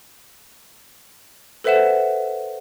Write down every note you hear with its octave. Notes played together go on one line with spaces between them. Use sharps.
A4 B4 C5 E5 F#5 E7